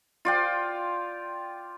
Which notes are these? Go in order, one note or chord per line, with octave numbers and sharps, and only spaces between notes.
F4 D5 G5